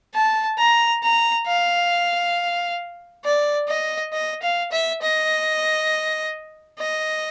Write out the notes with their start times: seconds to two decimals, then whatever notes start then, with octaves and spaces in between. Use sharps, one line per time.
0.15 A5
0.59 A#5
1.03 A#5
1.48 F5
3.25 D5
3.68 D#5
4.13 D#5
4.42 F5
4.72 E5
5.02 D#5
6.79 D#5